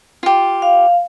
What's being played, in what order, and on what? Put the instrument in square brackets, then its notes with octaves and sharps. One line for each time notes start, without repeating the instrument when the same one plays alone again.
[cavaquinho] F4 G4
[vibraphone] F5